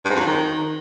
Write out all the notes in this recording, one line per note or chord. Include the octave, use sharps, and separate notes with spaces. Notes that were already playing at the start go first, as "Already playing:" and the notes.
G2
G#2
F2
F#3
D#3